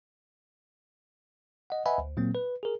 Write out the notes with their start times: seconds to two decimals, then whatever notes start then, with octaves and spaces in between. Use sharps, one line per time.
1.70 D#5 F#5
1.86 B4 D#5 E5 F#5 G#5 B5
1.98 D2
2.17 A#2 F#3 A#3 C4
2.35 B4
2.63 G#4 A#4